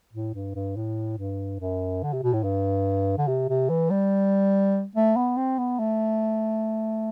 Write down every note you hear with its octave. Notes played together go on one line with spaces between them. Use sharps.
A2
G2
G2
A2
G2
F#2
D3
C3
B2
A2
G2
D3
C3
C3
E3
G3
A3
B3
C4
B3
A3